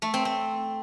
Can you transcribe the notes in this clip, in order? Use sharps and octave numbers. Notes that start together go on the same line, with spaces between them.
A3
C4
C4